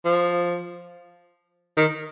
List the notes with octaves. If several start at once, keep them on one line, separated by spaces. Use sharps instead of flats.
F3
D#3